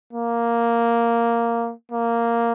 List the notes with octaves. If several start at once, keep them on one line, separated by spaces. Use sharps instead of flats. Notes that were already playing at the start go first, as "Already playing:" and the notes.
A#3
A#3